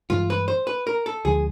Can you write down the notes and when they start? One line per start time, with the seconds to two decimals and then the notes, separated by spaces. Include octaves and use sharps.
0.10 G2 E3 G#3 F4
0.30 B4
0.48 C5
0.67 B4
0.87 A#4
1.06 A4
1.25 D2 D3 F3 G#3 G#4